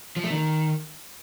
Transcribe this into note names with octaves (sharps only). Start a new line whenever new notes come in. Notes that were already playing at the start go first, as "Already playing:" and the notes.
F3
A3
D#3